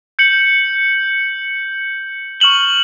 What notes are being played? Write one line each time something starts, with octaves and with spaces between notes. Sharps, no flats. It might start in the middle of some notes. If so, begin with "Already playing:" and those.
G6 C#7 F#7
C#6 F6 E7 F#7 G7